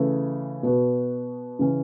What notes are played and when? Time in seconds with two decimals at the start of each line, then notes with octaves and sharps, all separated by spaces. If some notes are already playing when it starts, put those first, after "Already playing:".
Already playing: C#3 E3 A3
0.63 B2 B3 F#4
1.59 C#3 E3 C#4